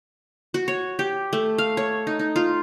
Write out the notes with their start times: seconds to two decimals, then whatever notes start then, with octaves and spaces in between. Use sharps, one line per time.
0.54 F#4
0.68 C#5
0.99 G4
1.33 A3
1.58 F5
1.77 C#5
2.07 D#4
2.19 D#4
2.36 F4